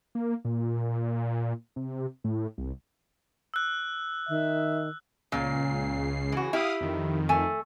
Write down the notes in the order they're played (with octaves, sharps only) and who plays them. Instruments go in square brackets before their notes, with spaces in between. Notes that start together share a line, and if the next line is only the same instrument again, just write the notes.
[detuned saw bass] A#3
A#2
C3
A2
C2
[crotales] E6 F#6
[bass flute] D#3 [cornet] E5
[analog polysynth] C#2 C#3 C7 [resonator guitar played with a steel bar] A#2
[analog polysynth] C#3 [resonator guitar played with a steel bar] E3 F#4
[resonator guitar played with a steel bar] E4 G4 [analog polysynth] F5 D#6
[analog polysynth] F2 D#3
[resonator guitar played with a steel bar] A3 G#5